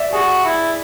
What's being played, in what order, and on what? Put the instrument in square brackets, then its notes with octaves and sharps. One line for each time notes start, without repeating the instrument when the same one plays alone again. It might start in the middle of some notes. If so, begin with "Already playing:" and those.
Already playing: [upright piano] D5 E5
[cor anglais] F#4 [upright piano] G#4
[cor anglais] E4